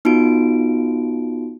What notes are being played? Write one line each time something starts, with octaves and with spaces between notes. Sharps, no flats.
B3 D#4 F4 F#4 D7